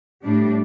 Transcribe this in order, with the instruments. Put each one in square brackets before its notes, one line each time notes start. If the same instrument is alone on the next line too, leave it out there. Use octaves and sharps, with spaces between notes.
[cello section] A2 G3 D4